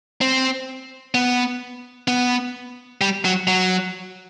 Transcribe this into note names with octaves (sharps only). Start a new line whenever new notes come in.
C4
B3
B3
G3
F#3
F#3